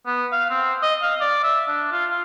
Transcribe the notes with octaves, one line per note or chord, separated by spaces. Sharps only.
B3
F5
C4
D#5
F5
D5
E5
D4
F4
F4